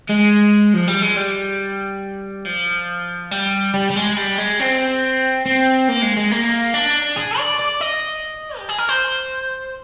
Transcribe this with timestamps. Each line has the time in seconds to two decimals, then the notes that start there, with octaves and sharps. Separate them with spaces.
0.09 G#3
0.74 F3
0.88 G3
1.02 G#3
1.17 G3
2.45 F3
3.31 G3
3.74 G3
3.90 G3
3.96 G#3
4.17 G3
4.38 G#3
4.60 C4
5.46 C4
5.89 A#3
6.02 G#3
6.17 G#3
6.31 A#3
6.74 D4
7.17 G#4
7.39 D5
7.60 D5
7.81 D#5
8.58 G4
8.69 G#4
8.78 A#4
8.89 C5